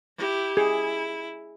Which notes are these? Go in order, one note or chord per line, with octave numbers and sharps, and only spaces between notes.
E4 G4
E4 G#4